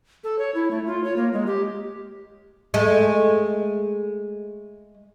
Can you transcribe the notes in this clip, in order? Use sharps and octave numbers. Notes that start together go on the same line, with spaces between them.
A4
C#5
E4
A3
F4
C#5
A#3
G#3
G4
G#3 A3